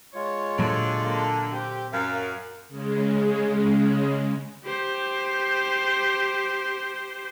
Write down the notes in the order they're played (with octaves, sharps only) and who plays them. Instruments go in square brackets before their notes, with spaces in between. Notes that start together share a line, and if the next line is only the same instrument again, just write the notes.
[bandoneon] G#3 F4 [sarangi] C#5
[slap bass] A#2 F#3 [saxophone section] D3
[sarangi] A#3
[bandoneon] C4 [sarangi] G4
[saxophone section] F#2 [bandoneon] A#4 [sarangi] F5
[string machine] C#3 G#3
[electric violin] G4 C5